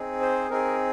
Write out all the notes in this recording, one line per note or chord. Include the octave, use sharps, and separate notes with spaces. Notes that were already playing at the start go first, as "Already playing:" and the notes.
Already playing: C4 D#4 G#4
C5
C4 D#4 G#4 A#4